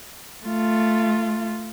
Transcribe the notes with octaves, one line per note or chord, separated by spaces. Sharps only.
A3 F4